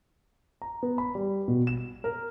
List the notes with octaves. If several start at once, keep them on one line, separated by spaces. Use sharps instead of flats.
A#5
B3
B5
G3
B2
E7
A#4